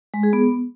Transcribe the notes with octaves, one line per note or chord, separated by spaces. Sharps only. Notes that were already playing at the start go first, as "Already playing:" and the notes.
G#3
G#4
B3